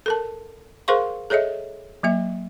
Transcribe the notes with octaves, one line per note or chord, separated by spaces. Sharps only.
A4 A#4 A5
G#4 A#4 C5 F5 C6 C#6
G#4 A4 C#5 D#5 E5
F#3 A#3 E5